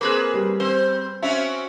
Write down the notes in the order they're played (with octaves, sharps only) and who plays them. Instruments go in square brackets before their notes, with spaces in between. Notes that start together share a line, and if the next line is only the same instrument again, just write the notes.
[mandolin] A#3 C4 F#6 [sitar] G#4 B4
[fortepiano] G3
[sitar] C4 [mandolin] C5
[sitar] C4 C#4 F#4 [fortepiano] E5